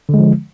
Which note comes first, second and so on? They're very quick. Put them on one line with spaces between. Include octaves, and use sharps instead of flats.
D3 G#3 F3